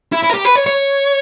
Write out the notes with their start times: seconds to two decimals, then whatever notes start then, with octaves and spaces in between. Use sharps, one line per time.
0.13 E4
0.23 E4
0.30 A#4
0.34 G4
0.45 B4
0.55 C#5
0.66 C#5